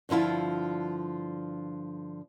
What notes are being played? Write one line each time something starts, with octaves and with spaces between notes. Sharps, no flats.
G2 D3 F3 E4 F4